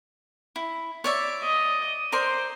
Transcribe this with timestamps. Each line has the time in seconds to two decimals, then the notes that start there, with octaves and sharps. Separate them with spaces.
0.56 E4
1.04 C#5 D5 E5
1.43 D#5
2.12 A#4 C5 D5 C6